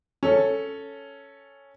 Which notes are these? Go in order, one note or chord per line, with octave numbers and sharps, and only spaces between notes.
C#4 A4